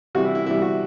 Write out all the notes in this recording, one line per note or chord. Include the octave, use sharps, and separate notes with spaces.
C3 E3 G3 F#4
E4
E4
C3 E3 G3 E4
F#4